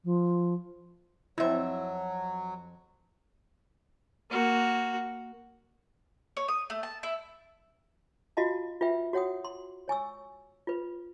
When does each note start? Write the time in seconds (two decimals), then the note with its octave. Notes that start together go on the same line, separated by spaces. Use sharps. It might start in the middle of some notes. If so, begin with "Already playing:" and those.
0.04 F3
1.38 F2 F#3 C4 E4 E5
4.30 A#3 F#4
6.37 C#5
6.48 D#6
6.70 A3
6.83 A5
7.03 E4
8.37 F4 F#4 D#5 F5 A5
8.81 F4 B4 E5 G5
9.13 F#4 C#5 F#5 G5 D#6
9.44 C6
9.88 C#5 G#5 C#6 E6
10.67 F4 B4